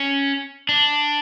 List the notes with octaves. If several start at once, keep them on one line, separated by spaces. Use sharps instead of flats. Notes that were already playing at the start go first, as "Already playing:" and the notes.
Already playing: C#4
D4